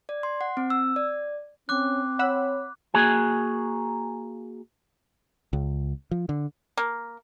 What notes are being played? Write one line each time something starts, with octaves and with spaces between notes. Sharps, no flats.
D5
C6
F#5
C4
E6
D5
C4 C#4 D6 F#6
C#5 F#5 B5 E6
A#3 F#4 G#4 G#5
C#2
F3
D3
A#3